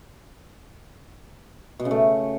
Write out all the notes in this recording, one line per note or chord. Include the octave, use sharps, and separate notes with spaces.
B2
C#3
A3